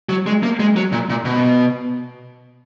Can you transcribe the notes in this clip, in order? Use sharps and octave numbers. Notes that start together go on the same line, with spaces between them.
F#3
G#3
A#3
G#3
F#3
A#2
A#2
B2